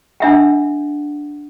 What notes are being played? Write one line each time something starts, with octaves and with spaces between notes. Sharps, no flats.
D4 E5 F#5